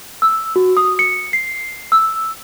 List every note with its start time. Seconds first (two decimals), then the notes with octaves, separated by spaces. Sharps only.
0.22 E6
0.56 F#4
0.77 D#6
0.99 C#7
1.33 C7
1.92 E6